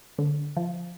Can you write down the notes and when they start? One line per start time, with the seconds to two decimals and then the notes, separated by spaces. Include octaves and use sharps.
0.18 D3
0.56 F3